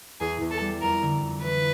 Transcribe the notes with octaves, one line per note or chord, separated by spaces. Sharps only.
E2 G#4
E2
A4
G3
F2 A#4
D3
F2
E3 B4